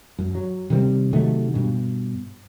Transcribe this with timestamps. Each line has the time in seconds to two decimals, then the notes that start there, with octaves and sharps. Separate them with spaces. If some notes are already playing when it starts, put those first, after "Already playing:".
0.19 F#2
0.35 F#3
0.70 C3 D#3 G3 C4
1.13 C3 D#3 F#3 A3
1.54 G2 B2